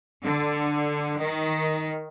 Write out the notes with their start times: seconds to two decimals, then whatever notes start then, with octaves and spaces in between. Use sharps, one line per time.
0.24 D3
1.22 D#3